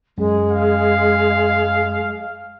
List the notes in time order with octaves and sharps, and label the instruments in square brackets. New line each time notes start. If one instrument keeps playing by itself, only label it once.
[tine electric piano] F#2 [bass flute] G#3
[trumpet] F5